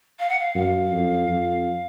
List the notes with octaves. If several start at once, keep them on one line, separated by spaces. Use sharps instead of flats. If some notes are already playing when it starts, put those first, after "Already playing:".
F5
F#5
F5
F#2 F5
F2
F2